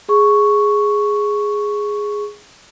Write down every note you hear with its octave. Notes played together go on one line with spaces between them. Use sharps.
G#4 C#6